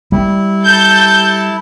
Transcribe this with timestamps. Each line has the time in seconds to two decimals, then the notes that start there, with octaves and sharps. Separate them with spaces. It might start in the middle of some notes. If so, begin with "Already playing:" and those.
0.12 G3 E4
0.64 A4 A5 G6